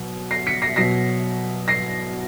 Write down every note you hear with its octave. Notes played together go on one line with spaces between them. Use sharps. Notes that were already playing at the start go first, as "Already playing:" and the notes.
Already playing: B2 F#3
A#6 C7
B6 C#7
A#6 C7
B2 F#3 A#6 C7
A#6 C7